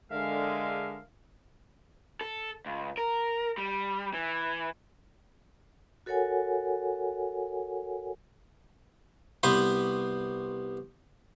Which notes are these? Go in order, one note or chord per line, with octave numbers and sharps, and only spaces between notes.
D3 G#3 A#4 E5 F5
A4
C#2
A#4
G3
E3
F#4 A4 A#4 C#5 F#5 G#5
C2 B3 B4 C5 C6